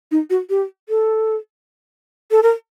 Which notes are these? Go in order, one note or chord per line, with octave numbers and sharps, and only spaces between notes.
D#4
F#4
G4
A4
A4
A#4